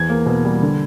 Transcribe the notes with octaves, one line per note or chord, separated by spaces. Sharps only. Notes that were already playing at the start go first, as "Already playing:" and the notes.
Already playing: E2 G#6
A#3
B2
G3
D3